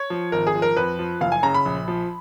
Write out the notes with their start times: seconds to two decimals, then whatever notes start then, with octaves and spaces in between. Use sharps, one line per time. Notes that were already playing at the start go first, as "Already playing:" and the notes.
Already playing: C#5
0.10 F3
0.32 G#1 A#4
0.47 G#4
0.55 F3
0.62 A#4
0.77 F2 B4
0.99 F3
1.21 F#1 F5
1.32 G#5
1.43 C#3 A#5
1.54 B5
1.65 A#1
1.88 F3